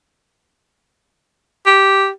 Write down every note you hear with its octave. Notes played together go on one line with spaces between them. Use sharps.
G4